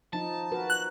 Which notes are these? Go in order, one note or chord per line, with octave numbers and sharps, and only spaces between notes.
F3 D#4 A5
F#4 A#4 B4
F#6